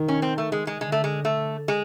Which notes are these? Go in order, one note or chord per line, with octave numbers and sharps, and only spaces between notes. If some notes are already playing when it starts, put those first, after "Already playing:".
Already playing: D#3
C#4
C4
A3
G#3
G#3
D3 G#3
A3
G#3
A3
G#3